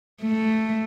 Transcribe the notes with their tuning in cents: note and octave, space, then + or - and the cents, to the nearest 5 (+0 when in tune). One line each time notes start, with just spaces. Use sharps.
A3 +0